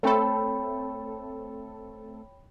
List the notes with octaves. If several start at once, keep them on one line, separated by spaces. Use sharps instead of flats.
A3 C4 A4 C#5 G5 B5